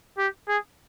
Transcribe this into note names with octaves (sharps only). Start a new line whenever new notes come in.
G4
G#4